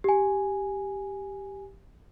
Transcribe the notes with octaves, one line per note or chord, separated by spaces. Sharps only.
G4 G#5